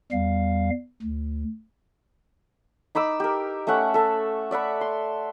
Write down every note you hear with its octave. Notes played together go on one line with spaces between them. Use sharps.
E2 G3 F5
D2
D#4 B5 D6 E6
G4 A#4
A3 C#4 E5 F#5
A4 E5
D5 E5 F#5 B5
C6